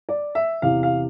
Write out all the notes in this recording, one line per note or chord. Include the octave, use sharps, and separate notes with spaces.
D5
E5
E2 C3 E3 F5
F5